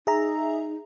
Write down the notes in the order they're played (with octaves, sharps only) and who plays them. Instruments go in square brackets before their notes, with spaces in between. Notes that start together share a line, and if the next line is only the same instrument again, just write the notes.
[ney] D#4 [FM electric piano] G#4 E5 A#5